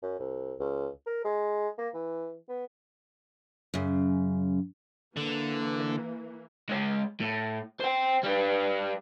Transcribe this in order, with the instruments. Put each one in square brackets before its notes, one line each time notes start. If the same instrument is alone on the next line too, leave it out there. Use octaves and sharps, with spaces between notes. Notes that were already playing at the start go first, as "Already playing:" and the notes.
[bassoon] F#2
C2
C#2
A#4
G#3
A#3
E3
B3
[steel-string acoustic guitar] F#2 C#3
[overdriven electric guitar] D3 [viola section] E3 A#3
[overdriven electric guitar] G#3 C#5
A2
C5 G5
G3 B4